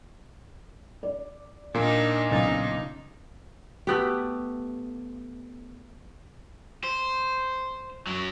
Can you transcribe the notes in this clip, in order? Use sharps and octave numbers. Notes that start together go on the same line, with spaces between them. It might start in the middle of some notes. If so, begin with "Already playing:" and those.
D5
A#2 A#3 D4 D#4
B1 C#3 D#4 A6
A3 B3 G4
C5
F#2 F#3